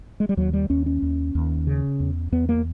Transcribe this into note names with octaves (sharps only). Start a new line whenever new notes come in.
G#3
G3
D#2 F#3
G3
D#2 C#4
C#4
D#2
D#2
C#3
E2
E2 B3
A#3